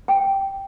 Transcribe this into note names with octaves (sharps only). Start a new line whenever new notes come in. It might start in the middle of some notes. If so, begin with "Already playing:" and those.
G5